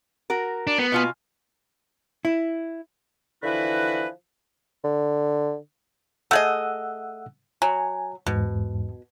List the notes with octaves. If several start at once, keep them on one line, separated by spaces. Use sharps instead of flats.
F#4 A#4
D4
B3
B2 F4 G#5
E4
D3 E3 F3 E4 F#4 B4
D3
A3 G#4 D#5 F#5 E6 F#6
F#3 G#5
E2 G#2 B2